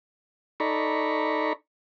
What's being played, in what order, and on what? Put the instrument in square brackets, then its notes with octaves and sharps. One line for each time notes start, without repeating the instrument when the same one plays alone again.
[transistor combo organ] D#4 A4 D5 A#5 B5 C#6